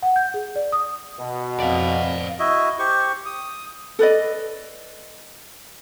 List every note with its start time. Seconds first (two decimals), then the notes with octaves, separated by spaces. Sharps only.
0.02 F#5
0.16 G6
0.34 G#4
0.56 D5
0.72 D#6
1.19 B2
1.60 F2 D5 F5
2.39 E4 F#4 D#5 E5
2.79 G4 C5 C#6
3.26 D#6
3.99 A4 B4 D5 D#5